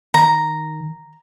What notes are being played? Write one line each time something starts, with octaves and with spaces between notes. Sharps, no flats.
D#3 A#5